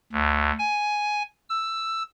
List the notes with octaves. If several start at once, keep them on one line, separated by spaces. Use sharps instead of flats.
D2
G#5
E6